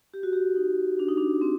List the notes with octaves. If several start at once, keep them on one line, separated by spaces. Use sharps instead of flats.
G4
F#4
G4
D#4
D4
D#4
D4
C4